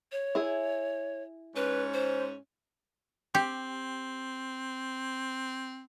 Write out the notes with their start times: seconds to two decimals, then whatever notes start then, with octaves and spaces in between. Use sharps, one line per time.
0.12 C#5
0.35 E4 G#4
1.56 G#2 C#4 B4
1.94 C5
3.35 C4 G4